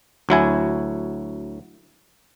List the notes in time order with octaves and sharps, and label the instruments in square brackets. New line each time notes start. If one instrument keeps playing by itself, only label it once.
[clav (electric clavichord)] D2 F#3 E4 G#5